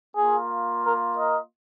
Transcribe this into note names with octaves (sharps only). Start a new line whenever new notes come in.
A#3 F4 G#4
A#4
A#4 D#5